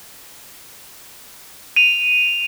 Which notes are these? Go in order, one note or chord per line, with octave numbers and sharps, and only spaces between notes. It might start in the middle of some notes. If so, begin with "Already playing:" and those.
D#7 F7